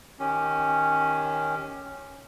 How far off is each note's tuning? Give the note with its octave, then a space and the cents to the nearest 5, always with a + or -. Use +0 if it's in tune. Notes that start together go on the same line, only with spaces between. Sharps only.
D#3 -5 C#4 +0 G4 +10